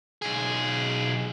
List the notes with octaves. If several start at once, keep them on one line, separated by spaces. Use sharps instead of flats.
B1 G#4